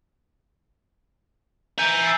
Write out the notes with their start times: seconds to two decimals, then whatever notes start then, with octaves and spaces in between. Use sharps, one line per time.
1.78 E5 G#5 A#5 G6 C#7
2.03 E6 A6 C7